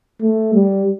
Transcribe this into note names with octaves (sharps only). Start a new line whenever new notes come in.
A3
G3